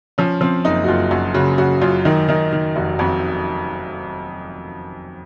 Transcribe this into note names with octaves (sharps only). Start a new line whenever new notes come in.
F3 C#4
F3 C4
F#1 D#4
F#4
F#1 F4
F#2 F#4
C#3 F#4
C#3 F#4
F#2 F4
D#3 D#4
D#3 D#4
D#3
F1 F#4
F2 F#4